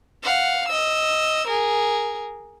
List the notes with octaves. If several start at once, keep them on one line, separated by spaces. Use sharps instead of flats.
F5 F#5
D#5 E6
G#4 A#4